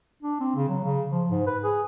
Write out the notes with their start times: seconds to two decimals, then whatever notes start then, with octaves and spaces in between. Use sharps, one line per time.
0.23 D4
0.40 C4
0.56 C#3
0.69 F#3
0.84 C#3
1.11 F3
1.30 G#2
1.47 B4
1.64 G#4